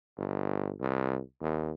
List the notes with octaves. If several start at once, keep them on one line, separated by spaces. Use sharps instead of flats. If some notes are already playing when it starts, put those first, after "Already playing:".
G1
C2
D#2